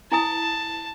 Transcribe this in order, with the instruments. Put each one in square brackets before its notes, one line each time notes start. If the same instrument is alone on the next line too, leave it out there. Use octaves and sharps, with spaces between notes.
[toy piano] E4 G#5 D#6 [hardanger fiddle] A5